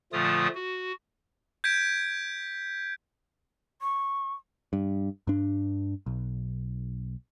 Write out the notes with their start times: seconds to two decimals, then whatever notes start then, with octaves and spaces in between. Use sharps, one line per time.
0.13 A#2 D3 F3 A3 F4 D#6
0.55 F#4
1.64 G6 G#6 B6 D7
3.80 C#6
4.73 G2
5.27 G2 D4
6.06 B1